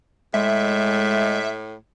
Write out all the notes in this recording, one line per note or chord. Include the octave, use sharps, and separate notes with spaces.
A2 G#3 E5